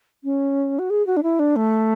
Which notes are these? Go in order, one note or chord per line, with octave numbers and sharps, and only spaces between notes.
C#4
F#4
G#4
F#4
D4
E4
D4
A3